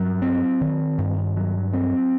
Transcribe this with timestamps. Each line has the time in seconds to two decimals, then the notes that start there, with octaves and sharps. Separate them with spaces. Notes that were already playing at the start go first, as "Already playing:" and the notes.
Already playing: G2 F#3
0.22 C4
0.61 D#3
0.98 G2
1.37 F#3
1.74 C4